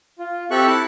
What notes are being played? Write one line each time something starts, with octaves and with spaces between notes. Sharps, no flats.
F4
C4 G4 A4 E5 C#6 F#6
E4 A5 F#6